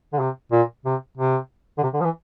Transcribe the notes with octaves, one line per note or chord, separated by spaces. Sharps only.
D3
C3
A#2
C3
C3
D3
C3
D3
F3
E3